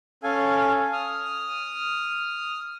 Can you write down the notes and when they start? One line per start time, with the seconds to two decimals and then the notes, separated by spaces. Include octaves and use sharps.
0.23 C#4 A4 F5 G#5
0.93 D#6 F6